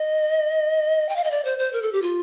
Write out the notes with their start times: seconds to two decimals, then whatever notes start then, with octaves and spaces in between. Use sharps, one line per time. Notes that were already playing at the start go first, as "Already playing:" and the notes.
Already playing: D#5
1.09 G5
1.16 F5
1.24 D#5
1.31 D5
1.45 C5
1.59 C5
1.73 A#4
1.82 A4
1.92 G4
2.02 F4